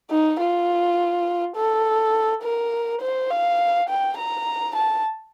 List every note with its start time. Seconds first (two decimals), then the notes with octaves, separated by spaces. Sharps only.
0.11 D#4
0.40 F4
1.56 A4
2.43 A#4
3.02 C5
3.31 F5
3.89 G5
4.18 A#5
4.76 A5